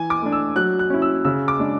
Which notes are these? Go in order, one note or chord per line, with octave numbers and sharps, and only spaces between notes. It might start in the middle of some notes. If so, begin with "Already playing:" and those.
Already playing: E3 G#5
D6
A3 D4
E6
F#3 F#6
F#6
C#4 E4
E6
C#3 E6
D6
G#3 D4